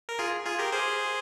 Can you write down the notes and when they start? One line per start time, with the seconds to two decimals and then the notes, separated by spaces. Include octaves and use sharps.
0.09 A#4
0.19 F4 G#4
0.45 F4 G#4
0.59 G4 A#4
0.72 G#4 C5